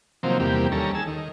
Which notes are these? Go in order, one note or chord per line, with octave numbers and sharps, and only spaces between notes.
C3 D#3 F3 F#3 A#3 C4
E2 C3 G3 A#3 G4
D#2 G3 C#4 A4 A#5
G#4 A5 E6
D#3